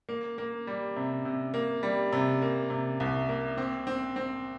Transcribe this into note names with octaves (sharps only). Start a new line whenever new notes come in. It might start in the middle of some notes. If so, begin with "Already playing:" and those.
A#3
A#3
G3
C3
C3
A#3
G3
C3
A#3
C3
C2
A#3
C4
C4
C4